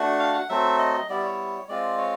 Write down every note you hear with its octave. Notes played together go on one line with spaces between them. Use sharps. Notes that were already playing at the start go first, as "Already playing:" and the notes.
Already playing: A3 D4 F#4
F5
F#5
F#3 A3 C4 E5
D#5
D#5
G3 B3 E4 D5
C#5
G#3 C4 F4 D5
C#5